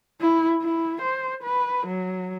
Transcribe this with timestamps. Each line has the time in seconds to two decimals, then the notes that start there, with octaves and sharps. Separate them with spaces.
0.21 E4
0.62 E4
1.02 C5
1.44 B4
1.87 F#3